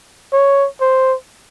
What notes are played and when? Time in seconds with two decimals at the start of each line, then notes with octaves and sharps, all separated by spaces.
0.33 C#5
0.81 C5